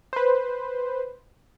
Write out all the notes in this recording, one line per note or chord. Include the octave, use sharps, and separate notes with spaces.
B4 C5